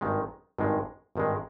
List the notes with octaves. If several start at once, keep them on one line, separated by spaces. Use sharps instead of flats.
G#1 G2 D#3 G#3
G#1 G2 D#3 G#3
G#1 G2 D#3 G#3